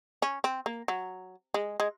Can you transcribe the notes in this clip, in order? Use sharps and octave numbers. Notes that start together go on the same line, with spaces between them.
C#4
C4
A#3
F#3
G#3
G#3